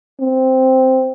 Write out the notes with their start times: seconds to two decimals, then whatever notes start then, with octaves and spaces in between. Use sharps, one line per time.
0.20 C4